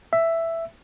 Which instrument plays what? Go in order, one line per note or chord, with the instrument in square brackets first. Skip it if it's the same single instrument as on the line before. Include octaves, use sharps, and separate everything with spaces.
[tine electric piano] E5